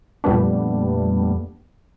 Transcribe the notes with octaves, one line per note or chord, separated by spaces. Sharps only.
F2 A#2 G3 A3 B3 D4